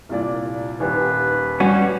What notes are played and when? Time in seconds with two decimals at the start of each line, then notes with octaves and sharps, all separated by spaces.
0.09 C2 A#2 D5
0.80 D#1 D#2 B4
1.60 G3 C#4 F#4